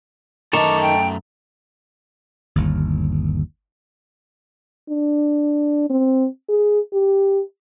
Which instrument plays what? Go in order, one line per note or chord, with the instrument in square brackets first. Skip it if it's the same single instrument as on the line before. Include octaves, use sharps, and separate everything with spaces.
[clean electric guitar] F#2 A3 A#5 [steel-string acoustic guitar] D#3 [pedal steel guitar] A4 A5 C#6 [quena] D6
[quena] G5
[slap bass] G1 D#2
[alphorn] D4
C4
G#4
G4